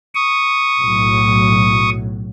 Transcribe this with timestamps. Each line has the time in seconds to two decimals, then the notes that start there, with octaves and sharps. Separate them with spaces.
0.15 C#6 D#6
0.80 B1 A2 F#3